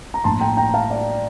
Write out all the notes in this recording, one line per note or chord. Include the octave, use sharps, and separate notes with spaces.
A#5
A2 F3 A#3 D4 A5 C6
G5 A#5
G5 A#5
F5 A5
D5 F5